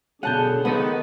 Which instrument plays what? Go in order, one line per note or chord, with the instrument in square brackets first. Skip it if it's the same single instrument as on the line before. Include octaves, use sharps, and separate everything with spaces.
[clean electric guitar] B2 C#4 [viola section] D3 F#3 G#4 [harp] F#5 A5 G6
[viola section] D#3 B4 [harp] B3 D#6 [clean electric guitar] D#4 A4 F#5